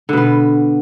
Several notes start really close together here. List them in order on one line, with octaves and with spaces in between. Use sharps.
D3 B2 B3